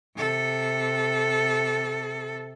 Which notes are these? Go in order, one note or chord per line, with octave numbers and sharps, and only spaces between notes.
C3 A4